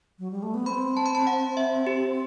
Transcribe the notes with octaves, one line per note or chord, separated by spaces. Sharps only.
F#3
G3
A3
B3
C4 B5
A5
B5
A5
F#5
E5
G4